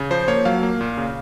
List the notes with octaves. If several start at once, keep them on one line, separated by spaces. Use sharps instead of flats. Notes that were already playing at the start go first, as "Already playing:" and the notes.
Already playing: C#3
F3 C5
A#3 C#5
F#3 F5
A#3
A#2
C#3